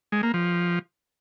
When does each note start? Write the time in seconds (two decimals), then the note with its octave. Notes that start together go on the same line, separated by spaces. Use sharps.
0.12 G#3
0.23 A#3
0.34 F3